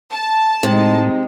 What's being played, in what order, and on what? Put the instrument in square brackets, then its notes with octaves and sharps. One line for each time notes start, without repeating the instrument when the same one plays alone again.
[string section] A5
[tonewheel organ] A2 [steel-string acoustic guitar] C3 [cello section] G#3 D#4